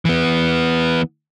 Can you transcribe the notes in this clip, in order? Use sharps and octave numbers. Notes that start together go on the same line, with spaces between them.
E3 B3